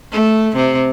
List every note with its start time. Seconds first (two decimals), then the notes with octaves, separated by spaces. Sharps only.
0.12 A3
0.56 C3